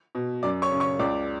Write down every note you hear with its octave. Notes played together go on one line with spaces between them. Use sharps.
B2
F#2 D5 D6
C#5 C#6
C#3
C#5 C#6
C#2 D5 D6